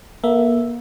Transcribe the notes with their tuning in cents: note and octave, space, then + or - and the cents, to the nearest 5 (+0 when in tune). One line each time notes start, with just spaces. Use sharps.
A#3 +35 A4 +25 E5 +0